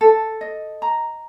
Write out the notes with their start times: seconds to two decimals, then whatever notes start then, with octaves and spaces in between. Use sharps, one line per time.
0.01 A4
0.41 D#5
0.82 A#5